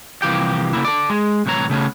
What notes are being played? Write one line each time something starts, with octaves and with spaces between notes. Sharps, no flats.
C2 E3 F3 A#3 G4 G5
C#3 A#3 E4
A4 D5
G#3
C2 A2 E3 C#5 A#5
C#3 A3 B3 C#4